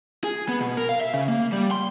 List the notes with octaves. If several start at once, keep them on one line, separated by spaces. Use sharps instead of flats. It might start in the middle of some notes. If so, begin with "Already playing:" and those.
G#4
B3
B2
A#4
F5
E5
C#3
A#3
G3
C6